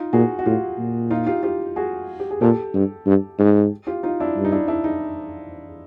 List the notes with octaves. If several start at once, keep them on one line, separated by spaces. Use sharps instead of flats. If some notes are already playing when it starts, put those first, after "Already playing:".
Already playing: D#4 F4
A#2 F#4 G#4
F#4
A2 F4 G4
A#2
D#4 F4
F4 G4
F4 G4
F#4 G#4
G4
G#4
A#2 G4 A4
G2
G2
G#2
F4 G4
D#4 F4
D4 E4
G2
D#4
D4 E4
D4 E4
D#4